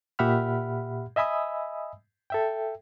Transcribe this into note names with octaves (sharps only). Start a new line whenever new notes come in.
A#2 G4 E5 F#5 B5 F6
D#5 E5 G#5 B5 D#6 E6
A4 E5 G5